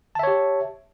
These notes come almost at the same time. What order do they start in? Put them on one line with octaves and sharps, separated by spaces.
A5 E5 C#5 G4